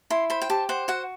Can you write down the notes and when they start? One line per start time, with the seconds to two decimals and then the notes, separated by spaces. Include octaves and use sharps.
0.10 E4 C6
0.30 C5 B5
0.42 G5
0.50 G4 A5
0.69 C5 F#5
0.88 F#4 F#5